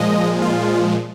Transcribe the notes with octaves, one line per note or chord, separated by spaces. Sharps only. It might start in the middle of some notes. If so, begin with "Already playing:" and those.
Already playing: A#2 F3 G#3 D#5
F4